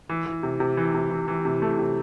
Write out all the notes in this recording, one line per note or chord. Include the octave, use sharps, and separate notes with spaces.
E3
E3
C3
C3
E3
C3
E3
E3
C3
A3
C3